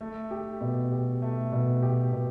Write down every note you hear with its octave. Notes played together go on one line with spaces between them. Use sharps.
A3
G4
B2
G4
A3
B2
G4
B2